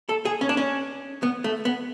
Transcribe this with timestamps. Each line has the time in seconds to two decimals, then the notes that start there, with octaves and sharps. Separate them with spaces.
0.09 A4
0.25 G#4
0.41 C#4
0.49 D4
0.57 C#4
1.23 B3
1.44 A3
1.65 B3